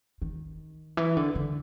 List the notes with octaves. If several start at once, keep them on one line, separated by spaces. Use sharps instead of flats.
D#3
E3
D3
D3